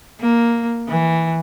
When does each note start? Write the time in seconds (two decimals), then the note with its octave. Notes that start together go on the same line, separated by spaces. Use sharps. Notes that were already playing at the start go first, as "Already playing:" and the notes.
0.21 A#3
0.89 E3